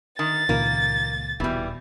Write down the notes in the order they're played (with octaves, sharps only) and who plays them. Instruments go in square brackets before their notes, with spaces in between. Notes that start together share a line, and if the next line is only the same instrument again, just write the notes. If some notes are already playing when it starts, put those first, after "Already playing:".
[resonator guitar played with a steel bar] D#3 [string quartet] A6
[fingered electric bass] C#2 A#2 D#3 [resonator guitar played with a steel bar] A#3
[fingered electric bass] D#1 B2 [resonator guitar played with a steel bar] E3 G3